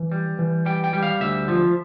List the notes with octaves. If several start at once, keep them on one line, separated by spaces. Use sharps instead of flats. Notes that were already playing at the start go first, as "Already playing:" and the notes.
Already playing: E3
G3
E3
G3 G5
G5
G3
F5
D2 E5
F3